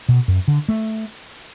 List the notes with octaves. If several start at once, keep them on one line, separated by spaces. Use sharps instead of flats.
B2
F#2
D3
A3